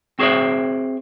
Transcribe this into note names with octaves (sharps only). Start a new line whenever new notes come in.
C4 F#4 G#4 C5 D5 E5